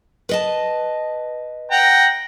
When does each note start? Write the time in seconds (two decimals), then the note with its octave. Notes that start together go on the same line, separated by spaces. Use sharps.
0.29 B4 D#5 A5
1.71 F#5 G5 A#5